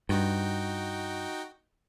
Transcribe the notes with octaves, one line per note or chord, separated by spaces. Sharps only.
G2 D#4 F#4 G5